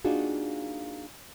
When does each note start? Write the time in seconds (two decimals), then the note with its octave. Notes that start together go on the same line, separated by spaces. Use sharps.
0.05 A#3 D4 D#4 F4 F#4 G#4